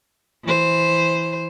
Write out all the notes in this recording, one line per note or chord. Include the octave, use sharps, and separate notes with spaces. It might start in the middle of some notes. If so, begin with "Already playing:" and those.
E3 C5